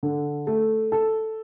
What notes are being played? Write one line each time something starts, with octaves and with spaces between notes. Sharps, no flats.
D3
A3
A4